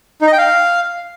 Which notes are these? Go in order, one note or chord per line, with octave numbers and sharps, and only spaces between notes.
D#4
D#5
G5
F5